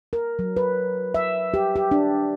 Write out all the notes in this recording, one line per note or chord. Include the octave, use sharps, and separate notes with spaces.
A#4
F#3
B4
E5
G4
G4
D4